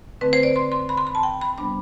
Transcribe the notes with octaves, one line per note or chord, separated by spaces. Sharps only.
D3 A3 C4 B4
C5
D5
C6
C6
B5
C6
B5
A5
G5
B5
C3 G3 B3 D4 B5